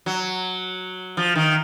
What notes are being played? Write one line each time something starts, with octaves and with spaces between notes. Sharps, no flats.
F#3
F3
D#3